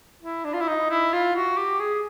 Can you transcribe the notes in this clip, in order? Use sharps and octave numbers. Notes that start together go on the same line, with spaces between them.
E4
D4
F4
E4
D#4
E4
F4
F#4
G4
G#4